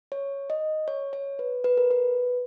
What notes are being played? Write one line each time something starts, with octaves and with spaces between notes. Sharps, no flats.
C#5
D#5
C#5
C#5
B4
B4
A#4
B4